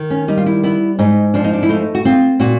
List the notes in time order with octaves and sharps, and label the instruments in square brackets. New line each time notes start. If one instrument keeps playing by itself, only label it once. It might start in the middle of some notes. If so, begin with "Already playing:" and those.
Already playing: [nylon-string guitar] D#3
C#4
G3 D#4
F4
E4
B3 E4
G#2 D#4
F3 D4
D#4
D4
E4
A3 D#4
F#4
C4 F4
A#2 F#4